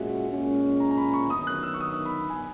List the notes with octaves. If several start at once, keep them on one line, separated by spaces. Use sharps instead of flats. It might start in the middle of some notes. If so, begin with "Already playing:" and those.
Already playing: A#2 G#3 C#4 F#4 E5 F#5
A#2 G#3 C#4
A#5
A#5
B5
C#6
D#3 F#3 B3 D#6
F#6
E6
C#6
D#6
B5
G#5